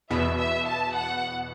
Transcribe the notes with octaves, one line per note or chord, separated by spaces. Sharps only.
E2 B2 B3 E5
E5
A5
F#5